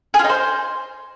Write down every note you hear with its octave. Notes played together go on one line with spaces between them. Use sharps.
G#4
F4
D#4
C5